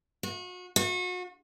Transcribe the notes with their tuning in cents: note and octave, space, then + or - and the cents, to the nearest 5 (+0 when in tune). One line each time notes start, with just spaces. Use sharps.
F#4 -35
F#4 -35